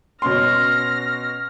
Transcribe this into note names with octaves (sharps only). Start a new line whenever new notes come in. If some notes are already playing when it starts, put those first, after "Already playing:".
B2 C#4 C6 F6 A#6